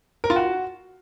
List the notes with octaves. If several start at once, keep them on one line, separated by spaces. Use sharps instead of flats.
A#4
F4
F#4